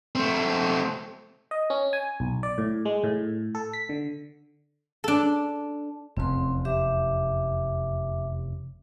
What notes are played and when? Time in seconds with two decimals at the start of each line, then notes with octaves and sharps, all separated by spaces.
0.15 A3 C4
1.51 D#5
1.70 C#4
1.93 G#5
2.20 B1
2.43 D5
2.58 A2
2.85 G#3
3.04 A2
3.55 A4
3.73 B6
3.89 D3
5.04 D4 A4
6.17 F1 E2 C#3 C4 C6
6.65 G4 E5 D6